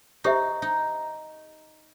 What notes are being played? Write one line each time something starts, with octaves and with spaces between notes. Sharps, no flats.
D#4 G4 C5 E5
D#4